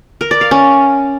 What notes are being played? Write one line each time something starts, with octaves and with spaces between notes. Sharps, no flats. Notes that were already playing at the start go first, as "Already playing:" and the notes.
A#4
D5
F5
C#4